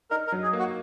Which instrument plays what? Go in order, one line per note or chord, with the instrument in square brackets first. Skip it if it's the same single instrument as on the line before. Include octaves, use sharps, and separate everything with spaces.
[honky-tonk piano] D#4 [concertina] A#4
[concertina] A#4
[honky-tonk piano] F#3
[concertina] G#4
[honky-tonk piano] A#3
[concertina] F#4